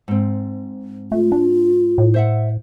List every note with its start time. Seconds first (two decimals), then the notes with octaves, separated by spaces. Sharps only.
0.08 G#2 C4
1.12 A3 F4
1.32 D4
1.98 A2
2.14 C5 E5 F#5